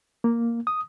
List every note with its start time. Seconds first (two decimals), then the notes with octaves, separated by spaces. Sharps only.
0.24 A#3
0.67 D#6